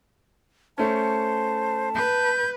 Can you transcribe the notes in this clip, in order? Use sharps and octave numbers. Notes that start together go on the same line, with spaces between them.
A3 C#4 C5 A5
B4 G6